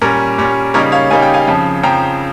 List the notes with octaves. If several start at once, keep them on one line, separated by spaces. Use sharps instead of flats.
A#2 G3 C#4 A#4
A#2 G3 C#4
C#3 G3 A#3 D#4 A#4 C#5
C#5 F5
C#3 G3 A#3 D#4 G#5
G5
F5 G#5
F2 C#3 F3
F2 C#3 F3 G5 A#5